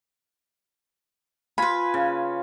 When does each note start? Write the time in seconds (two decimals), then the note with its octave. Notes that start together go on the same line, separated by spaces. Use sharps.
1.58 F4 B4 G#5 B5
1.94 C#3